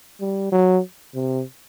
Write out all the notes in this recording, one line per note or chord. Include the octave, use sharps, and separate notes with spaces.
G3
F#3
C3